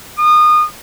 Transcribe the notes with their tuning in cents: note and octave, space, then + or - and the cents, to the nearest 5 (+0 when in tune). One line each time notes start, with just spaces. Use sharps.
D#6 -30